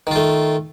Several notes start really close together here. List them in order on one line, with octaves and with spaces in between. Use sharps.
D#3 F4 A3